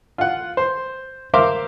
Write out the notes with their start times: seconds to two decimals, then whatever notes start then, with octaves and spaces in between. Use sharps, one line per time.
0.18 F4 F#5
0.57 C5
1.34 A#4 C5 E5 F5 C6 D6